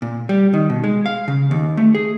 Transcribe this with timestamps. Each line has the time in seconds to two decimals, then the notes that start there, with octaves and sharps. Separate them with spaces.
0.02 A#2
0.29 G3
0.54 D#3
0.70 B2
0.84 G#3
1.06 F5
1.28 C#3
1.51 D#2
1.77 A3
1.95 G#4